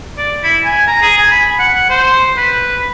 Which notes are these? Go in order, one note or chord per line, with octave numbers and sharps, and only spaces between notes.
D5
E4
G#5
A#5
G#4
G#5
B5
F#5
C5
B4